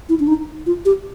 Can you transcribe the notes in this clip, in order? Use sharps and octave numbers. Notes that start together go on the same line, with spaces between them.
E4
D4
D#4
F4
G4